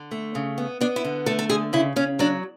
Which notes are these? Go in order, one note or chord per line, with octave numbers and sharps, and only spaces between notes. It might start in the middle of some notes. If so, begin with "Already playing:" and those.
Already playing: D3
A3
C#3
B3
B3 D4
E4
D3
A3 A4
A4
D3 G#4
C#3 E4
C#3 C#4
F#3 D4